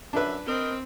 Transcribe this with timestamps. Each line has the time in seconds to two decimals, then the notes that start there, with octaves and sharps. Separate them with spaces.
0.13 F#2 D4 B4 E5
0.46 C4 A#4 C5 D#5